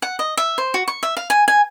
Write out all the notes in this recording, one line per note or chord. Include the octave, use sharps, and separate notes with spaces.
F#5
D#5
E5
C5
F#4
C#6
E5
F5
G#5
G#5